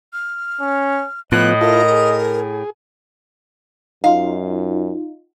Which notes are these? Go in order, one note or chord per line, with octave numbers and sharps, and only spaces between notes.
F6
C#4
A2 F3 B3 D#5 F#6
E4 F4 A4 A#4
G#4
F#2 D#4 F4 F5